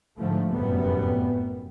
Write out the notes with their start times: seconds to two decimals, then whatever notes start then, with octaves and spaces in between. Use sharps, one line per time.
0.18 G#2 D3 F3 A3
0.53 F1 F#2 A2 G3 B3